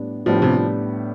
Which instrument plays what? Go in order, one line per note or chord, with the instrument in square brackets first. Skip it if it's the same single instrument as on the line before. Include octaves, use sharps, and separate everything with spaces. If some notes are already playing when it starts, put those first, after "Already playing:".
Already playing: [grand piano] A2 G3 B3 D4
[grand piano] A2 G3 B3 D4 [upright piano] F3
[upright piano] C3